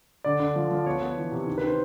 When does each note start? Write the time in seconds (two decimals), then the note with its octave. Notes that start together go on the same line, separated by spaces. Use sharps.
0.24 D3 D5
0.40 D3
0.56 F3
0.72 F3
0.86 B3 C#5
1.02 B3
1.17 E3
1.32 C3
1.47 D#3
1.58 B4
1.63 D#3 C5